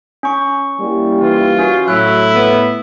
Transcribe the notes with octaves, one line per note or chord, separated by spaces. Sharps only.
C#4 C#6
G3 A#3 E4
E3 F4
C#4 F#4
A2 F#3 E4 F#6
B3